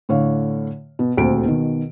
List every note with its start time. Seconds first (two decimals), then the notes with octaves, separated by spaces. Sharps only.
0.09 A2 D3 C#5 F5
0.99 B2
1.17 D#1 D2 C4 D7
1.46 B2 D#3